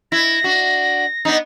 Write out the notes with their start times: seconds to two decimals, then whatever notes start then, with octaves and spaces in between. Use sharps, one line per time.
0.12 E4 A#6
0.44 D4 F#4
1.25 B3 D4 D#4